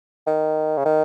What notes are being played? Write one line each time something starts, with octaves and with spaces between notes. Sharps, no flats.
D#3
C#3
D#3